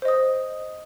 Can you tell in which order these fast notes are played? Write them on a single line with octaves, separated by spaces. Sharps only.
C5 D#5 D#6